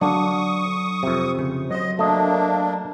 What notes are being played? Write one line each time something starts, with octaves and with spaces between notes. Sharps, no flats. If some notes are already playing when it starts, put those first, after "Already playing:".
D3 F#3 D4 A4 F5 C#6 D#6
F2 C3
C#3
F#3 C5 D#5
A3 A#3 D4 D#5